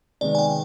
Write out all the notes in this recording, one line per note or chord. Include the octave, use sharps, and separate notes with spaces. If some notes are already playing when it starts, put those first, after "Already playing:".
C3 D#3 G#3 B3 D5
G#5
G5